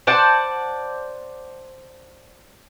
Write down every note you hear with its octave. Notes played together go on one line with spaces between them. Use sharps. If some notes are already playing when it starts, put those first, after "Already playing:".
C5 D5 F#5 A5